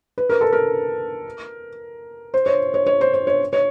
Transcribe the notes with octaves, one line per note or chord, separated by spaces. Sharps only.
B4
A#4
A4
A#4
C5
C#5
C#5
C#5
C5
C5
C#5
C#5